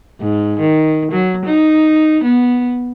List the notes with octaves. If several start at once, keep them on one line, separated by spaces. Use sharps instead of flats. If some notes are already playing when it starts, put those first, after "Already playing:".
G#2
D#3
F#3
D#4
B3